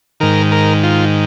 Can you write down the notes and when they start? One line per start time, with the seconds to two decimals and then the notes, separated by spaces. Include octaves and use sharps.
0.20 G#2 D#3 A#4
0.52 A#4
0.83 F4